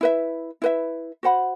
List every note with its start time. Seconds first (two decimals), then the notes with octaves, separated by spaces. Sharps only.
0.01 E4 B4 E5
0.62 E4 B4 E5
1.23 F#4 C5 F#5 B5